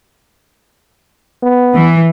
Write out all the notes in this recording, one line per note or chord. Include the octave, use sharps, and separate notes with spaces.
B3
E3